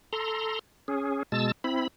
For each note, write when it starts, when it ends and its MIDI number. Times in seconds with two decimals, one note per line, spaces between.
0.13 0.59 69
0.13 0.59 82
0.13 0.59 84
0.88 1.23 61
0.88 1.23 68
1.32 1.52 47
1.32 1.52 56
1.32 1.52 81
1.32 1.52 88
1.32 1.52 93
1.64 1.88 60
1.64 1.88 64
1.64 1.88 83